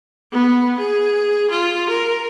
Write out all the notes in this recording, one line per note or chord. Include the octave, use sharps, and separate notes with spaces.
B3
G#4
F4
A#4